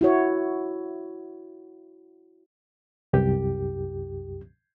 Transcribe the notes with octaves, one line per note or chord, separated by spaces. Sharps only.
E4 F#4 C#5
C2 F#2 G4